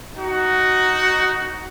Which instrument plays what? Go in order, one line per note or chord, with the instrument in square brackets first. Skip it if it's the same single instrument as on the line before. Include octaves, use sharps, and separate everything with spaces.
[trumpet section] D#4 F#4